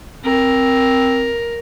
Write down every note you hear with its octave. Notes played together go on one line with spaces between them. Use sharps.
C4 A#4